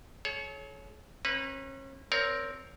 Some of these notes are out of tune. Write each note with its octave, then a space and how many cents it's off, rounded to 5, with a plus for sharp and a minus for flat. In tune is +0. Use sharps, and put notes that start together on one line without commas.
A4 -45 C#5 +0
C#4 -35 B4 +0 A#5 +25
C4 +0 A#4 +0 C#5 +30